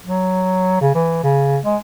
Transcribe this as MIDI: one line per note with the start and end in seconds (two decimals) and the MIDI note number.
0.05 0.77 54
0.81 0.90 49
0.95 1.21 52
1.24 1.58 49
1.65 1.77 56